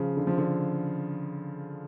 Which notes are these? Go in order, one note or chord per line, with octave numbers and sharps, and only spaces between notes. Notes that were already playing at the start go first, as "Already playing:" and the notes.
Already playing: C#3 F3
D3
F3
D3